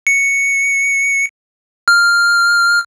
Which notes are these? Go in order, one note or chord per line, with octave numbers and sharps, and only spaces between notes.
C#7
F6